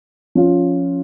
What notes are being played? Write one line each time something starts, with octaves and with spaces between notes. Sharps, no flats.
F3 C#4 F4